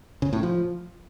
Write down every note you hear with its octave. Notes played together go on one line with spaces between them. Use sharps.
C#3
A2
F3